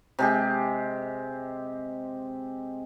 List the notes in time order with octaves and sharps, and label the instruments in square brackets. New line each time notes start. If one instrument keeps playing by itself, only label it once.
[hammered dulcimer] C3 G#3 G4